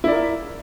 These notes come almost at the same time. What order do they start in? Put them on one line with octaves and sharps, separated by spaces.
E4 D5 A#4 E5